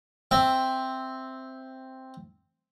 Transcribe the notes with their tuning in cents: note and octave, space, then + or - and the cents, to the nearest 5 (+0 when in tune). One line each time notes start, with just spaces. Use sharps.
C4 +0 E5 +0